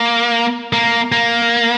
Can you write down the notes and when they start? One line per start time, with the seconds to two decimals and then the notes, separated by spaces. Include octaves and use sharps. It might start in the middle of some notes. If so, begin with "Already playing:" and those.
Already playing: A#3
0.73 A#3
1.12 A#3